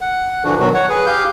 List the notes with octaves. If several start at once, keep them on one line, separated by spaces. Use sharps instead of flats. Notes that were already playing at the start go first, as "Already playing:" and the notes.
F#5
G2 D3 E3 F3 D4 F#4
B2 D#3 F#3 F#4
C#5 F#5
G#4 B4
G4 F5 G6